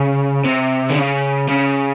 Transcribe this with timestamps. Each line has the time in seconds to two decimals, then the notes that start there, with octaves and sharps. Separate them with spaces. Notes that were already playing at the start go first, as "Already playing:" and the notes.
Already playing: C#3
0.44 C3
0.90 D3
0.96 C#3
1.48 C#3